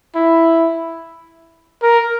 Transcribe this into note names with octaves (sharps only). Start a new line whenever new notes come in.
E4
A#4